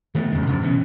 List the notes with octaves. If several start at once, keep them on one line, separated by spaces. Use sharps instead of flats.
D#3 E3 A3 B3
E2 C#3 F3 G#3
G2 C#3 F3 F#3
B2 E3 C#4